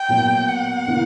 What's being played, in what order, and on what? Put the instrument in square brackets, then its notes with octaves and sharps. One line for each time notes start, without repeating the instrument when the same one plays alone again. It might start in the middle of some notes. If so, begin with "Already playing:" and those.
Already playing: [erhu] G5
[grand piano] B2 F#3 A#3
[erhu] F#5
[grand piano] C#3 E3 A#3 E4